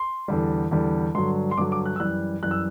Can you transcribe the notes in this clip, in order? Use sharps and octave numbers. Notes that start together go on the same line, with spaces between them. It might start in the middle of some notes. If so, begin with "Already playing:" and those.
Already playing: C6
E2 D3 G3
E2 D3 G3
G2 D3 F#3 C6
C6
G2 D3 F#3 D6
D6
F#6
E6
F#2 E3 G3 F#6
F#2 E3 G3 F#6
E6